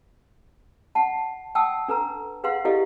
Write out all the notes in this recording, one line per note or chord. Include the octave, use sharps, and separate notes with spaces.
F#5 A5
F#5 G5 A5 D#6 E6
D4 A4 B4 A#5
G#4 B4 F5 F#5 C6
E4 G4 A4 D5 D#5 F5